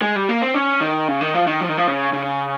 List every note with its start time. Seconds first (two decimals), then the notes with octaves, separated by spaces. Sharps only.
0.02 G#3
0.16 G3
0.29 A#3
0.42 C4
0.54 C#4
0.81 D#3
1.08 C#3
1.21 D#3
1.34 F3
1.47 D#3
1.61 F3
1.69 D#3
1.77 F3
1.87 C#3
2.13 C#3